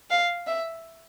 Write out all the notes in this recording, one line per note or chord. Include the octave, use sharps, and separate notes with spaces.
F5
E5